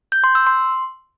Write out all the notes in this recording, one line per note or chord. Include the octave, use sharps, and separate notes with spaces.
G6
C6
E6
C6